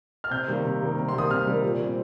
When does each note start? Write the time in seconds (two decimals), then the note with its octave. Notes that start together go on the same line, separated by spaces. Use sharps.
0.24 F6
0.31 C3 G6
0.48 D#3 G3 A#3
0.64 C3
0.81 D#3 G3 A#3
0.97 C3
1.09 C6
1.14 D#3 G3 A#3 D#6
1.30 C3 F6
1.47 D#3 G3 A#3
1.62 A#2
1.79 G3 C4